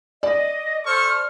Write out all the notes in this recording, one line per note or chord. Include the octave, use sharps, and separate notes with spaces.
D5 D#5
A4 C5 C#6 F6